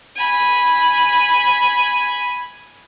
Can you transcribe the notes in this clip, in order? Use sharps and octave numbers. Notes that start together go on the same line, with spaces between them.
G#5 B5